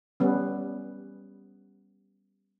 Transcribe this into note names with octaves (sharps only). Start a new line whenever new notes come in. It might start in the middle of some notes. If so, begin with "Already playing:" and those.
G3 B3 C#4